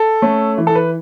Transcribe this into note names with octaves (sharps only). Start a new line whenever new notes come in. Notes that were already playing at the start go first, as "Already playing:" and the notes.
Already playing: A4
A3 C#4
E3
A4
B4